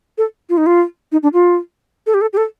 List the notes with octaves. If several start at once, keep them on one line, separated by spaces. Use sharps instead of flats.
A4
F4
D#4
F4
D#4
D4
F4
A4
G4
A4
G4
A4